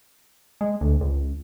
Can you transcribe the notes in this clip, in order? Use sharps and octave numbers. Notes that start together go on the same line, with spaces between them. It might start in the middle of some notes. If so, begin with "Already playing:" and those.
G#3
D2
C#2